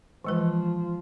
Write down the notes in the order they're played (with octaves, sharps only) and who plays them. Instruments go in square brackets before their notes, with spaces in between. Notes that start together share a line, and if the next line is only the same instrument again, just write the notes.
[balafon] E3 G#3 B4 [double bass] F3